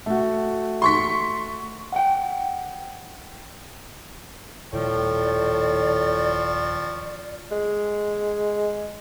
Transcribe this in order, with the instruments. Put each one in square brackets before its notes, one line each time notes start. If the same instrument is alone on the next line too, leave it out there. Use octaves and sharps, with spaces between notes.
[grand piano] A3 F#4
[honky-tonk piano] C6 C#6 B6
[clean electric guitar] F#5 G5
[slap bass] D#1 D#3 [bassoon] A2 [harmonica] F3 G5 C#6 [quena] D5
[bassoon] G#3